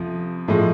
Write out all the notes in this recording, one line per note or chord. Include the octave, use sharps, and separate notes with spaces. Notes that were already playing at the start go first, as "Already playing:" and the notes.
Already playing: F2 C3 F3
A2 F3 G#3